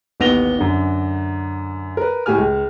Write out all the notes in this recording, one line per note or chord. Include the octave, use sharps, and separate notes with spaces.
A1 D#2 B3 A#6 F7 G7
F#2 D3
A#4 B4
A2 G4 G#5 F6
C#2